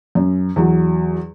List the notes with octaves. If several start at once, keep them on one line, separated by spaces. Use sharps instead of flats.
F#2
E2 F#3